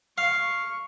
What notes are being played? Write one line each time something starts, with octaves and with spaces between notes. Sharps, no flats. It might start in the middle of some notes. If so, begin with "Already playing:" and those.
F5 C#6